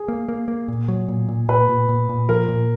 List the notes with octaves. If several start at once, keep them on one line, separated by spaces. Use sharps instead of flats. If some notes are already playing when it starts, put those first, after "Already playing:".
Already playing: G#4
A#3
A#3
A#3
A#2
F#3
A#2
A#2
A#2 B4
A#2
A#2
A#2
F3 A#4
A#2